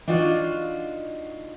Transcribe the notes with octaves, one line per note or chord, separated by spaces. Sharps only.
D4 D#4 F4 F#4 F5